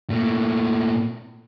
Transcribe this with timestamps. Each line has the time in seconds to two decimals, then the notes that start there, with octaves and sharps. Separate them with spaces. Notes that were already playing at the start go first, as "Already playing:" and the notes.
0.10 A#2 A3